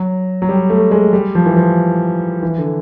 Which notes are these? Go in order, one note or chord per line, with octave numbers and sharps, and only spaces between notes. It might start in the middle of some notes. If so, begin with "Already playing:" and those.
Already playing: F#3
F#3
G3
A3
G#3
G3
F3
E3
F3
E3
D3